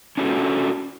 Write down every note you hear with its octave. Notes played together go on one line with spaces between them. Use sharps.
C#4 D4 E4 F#4 G4 A4